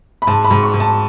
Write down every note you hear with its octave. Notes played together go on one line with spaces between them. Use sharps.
B5
G#2 A5
B5
G#2
C#6
G#2
A5